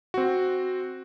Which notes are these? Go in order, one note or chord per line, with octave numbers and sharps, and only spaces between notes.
C4 F#4